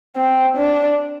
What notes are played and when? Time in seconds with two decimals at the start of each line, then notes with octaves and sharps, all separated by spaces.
0.16 C4
0.57 D4